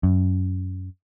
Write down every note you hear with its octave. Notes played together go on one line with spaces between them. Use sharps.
F#2